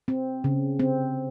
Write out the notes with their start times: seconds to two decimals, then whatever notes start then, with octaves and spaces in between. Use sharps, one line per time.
0.08 C4
0.44 C#3
0.79 C4